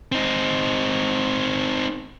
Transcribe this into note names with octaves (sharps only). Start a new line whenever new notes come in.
C4 D#4